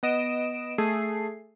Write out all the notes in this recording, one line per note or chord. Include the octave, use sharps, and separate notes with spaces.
B3 D#5 D7 E7
A3 G#4 C7